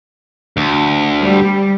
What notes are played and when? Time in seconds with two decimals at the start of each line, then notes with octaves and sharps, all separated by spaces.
0.57 D2
1.20 G3